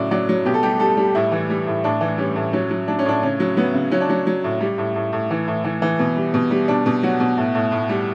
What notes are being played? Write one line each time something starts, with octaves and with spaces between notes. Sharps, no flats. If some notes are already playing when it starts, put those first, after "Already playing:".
Already playing: A2 C#3 F#3 D5
F#3 D5
F#3
B2 G4
A4
G3 G4
G3 A4
G3
A2 E4
E3
G3
A2
A2 D4
E3
G3 C#4
A2
F#3 C#4
F#3
F#3 D4
C#4
A2 D4
C#3 C#4
F#3
F#3 B3
C#3
F#3 C#4
D4
F#3 C#4
F#3
A2
G3
A2
A2
A2
E3
A2
E3
E3
B2
G3
B2
G3
B2 D4
B2
F#3 F#4
B2
A2
A2
A2
G3